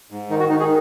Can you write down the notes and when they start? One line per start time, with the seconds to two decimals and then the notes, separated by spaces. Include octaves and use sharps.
0.11 G#2
0.30 D#3 D#4
0.40 F#4
0.50 D#3 D#4
0.60 G#4